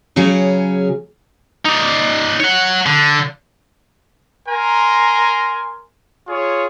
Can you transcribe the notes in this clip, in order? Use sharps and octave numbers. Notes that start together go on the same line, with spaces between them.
C#3 F#3 C#4 G#4
D#4 D5
C#5 F#5
D3
A#4 G#5 A#5 C6
F4 G#4 C#5